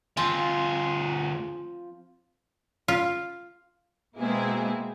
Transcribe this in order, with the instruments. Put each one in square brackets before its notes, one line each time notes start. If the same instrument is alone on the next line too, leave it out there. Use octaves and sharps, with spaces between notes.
[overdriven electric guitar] D2 G#4 [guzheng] F3 C4 F4
[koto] F4
[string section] B2 G#3 A#3 C4 E4 G#4